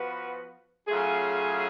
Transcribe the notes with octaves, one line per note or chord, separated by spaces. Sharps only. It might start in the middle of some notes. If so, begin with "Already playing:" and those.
Already playing: F3 B3 F#4 B4
C#3 F#3 A3 F4 G#4